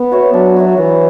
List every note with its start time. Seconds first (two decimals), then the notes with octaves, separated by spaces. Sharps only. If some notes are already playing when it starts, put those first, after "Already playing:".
Already playing: B3
0.11 F#4 C#5 E5
0.34 F#3 D4
0.56 F#4 C#5 E5
0.77 E3 B3